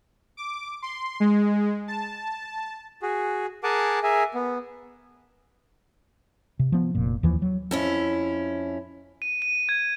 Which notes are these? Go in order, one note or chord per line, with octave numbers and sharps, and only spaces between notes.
D6
C6
G#3
A5
F#4 G#4
G#4 A#4 F#5 G#5 A5 D6
G#4 A#4 E5 G#5
B3
C3
F3 B3
F1 A#2
D#2 E3 F3
F#3
F2 C#4 E4
D#7
D#7
G#6